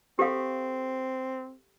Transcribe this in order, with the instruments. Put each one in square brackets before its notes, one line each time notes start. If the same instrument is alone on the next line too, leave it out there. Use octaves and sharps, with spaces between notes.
[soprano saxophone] C4 [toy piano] G4 A4 F5